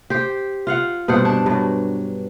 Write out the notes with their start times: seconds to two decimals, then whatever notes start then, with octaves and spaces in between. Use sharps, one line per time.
0.10 G4 C5
0.67 F4 F5 F#5
1.08 G2 B2 C5 F#5
1.25 D4
1.46 G2 F#3